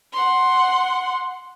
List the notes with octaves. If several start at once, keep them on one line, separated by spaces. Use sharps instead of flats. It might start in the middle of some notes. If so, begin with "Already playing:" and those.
F#5 C6